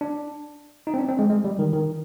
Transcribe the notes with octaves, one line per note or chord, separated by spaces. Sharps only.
D4
D#4
C4
D4
C4
G#3
G#3
G3
D#3
D#3